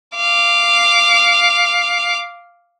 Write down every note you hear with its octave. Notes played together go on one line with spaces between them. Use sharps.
F5 D6